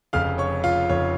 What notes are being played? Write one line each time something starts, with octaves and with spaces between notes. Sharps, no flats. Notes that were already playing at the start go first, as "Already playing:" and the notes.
F1 F2 C#3 F5 F6
C#5 C#6
F4 F5
F1 F2 C#3 C#5